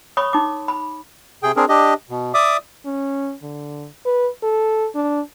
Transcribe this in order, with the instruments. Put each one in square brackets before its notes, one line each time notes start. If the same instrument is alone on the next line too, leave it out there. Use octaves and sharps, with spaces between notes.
[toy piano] C#5 B5 C#6 D#6
D#4 D6
B5
[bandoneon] C3 G#4 G5
C4 D4 G#4 A#4
D4 G4 D#5
B2
D5 E5 D6 D#6
[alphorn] C#4
D3
B4
A4
D4